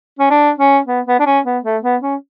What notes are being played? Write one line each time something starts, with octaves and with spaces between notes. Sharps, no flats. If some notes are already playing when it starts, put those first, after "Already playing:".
C#4
D4
C#4
B3
B3
D4
C#4
B3
A3
B3
C#4